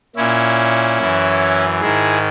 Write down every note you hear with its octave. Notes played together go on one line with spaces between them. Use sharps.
A#2 C#4 E4
F#2 E3
G#2 D#3 E4 G#4